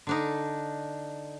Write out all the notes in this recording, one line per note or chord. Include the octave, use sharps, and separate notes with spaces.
D3 D4 D#4